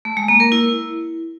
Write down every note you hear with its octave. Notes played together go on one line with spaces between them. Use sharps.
A3
G#3
A#3
A#4
E4